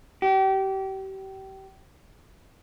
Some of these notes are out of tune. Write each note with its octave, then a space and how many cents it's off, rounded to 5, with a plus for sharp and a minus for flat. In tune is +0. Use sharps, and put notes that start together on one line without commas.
G4 -30